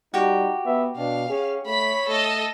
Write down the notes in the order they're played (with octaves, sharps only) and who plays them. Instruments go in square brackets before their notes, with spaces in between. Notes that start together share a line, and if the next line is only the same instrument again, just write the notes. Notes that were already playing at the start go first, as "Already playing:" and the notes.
[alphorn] G3 [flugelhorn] D#4 [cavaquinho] F#4 G4
[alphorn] B3 [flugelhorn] E5
[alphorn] B2 [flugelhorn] D4 [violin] F5
[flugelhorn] C#4 [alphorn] G#4
[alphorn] A3 [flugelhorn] C#5 [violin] B5 B6
[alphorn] A3 [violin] A4 D#5